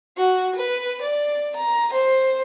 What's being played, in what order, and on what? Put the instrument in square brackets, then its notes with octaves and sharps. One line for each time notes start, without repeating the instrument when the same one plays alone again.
[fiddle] F#4
B4
D5
A#5
C5